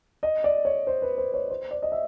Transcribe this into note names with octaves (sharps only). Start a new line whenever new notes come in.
D#5
D5
C#5
C5
B4
C5
C#5
C5
D5
D#5
E5